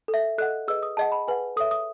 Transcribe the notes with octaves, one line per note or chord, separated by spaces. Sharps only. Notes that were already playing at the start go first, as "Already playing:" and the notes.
A4
E5
A4 D#5 F#5 F#6
G#4 B4 D#5 E6
D#6
G#4 D#5 F#5 A5
B5
G#4 B4 F#5 G#5
A4 C#5 E5 D#6
D#6